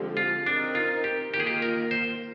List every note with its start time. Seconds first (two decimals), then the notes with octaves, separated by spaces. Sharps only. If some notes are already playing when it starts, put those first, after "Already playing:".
Already playing: D3 F3 G#3 C4 G4
0.17 F4
0.46 C4 D4 D#4 A#4
0.75 F4
1.04 G4
1.33 D#3 A#3 F4 G4
1.40 G#4
1.47 G4
1.62 A#4
1.91 C5